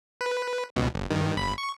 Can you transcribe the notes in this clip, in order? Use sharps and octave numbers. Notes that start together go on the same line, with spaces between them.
B4
C#2 B2
G1
G2 D#3
G1 B5
C#6